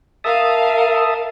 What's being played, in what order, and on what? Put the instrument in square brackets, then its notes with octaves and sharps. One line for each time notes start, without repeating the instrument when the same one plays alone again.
[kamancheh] A#4 F5 [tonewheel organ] E5 A5 D#6